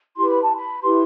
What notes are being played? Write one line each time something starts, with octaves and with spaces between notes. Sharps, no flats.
E4 G4 B4 C6
B5
A5
B5
E4 G4 B4 C6